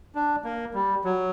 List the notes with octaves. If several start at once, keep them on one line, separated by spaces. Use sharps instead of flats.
D4
A#3
G3
F#3